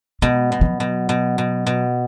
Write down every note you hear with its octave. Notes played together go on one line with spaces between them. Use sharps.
B2 G#3
B2
F3
F#3
B2
B2
B2
B2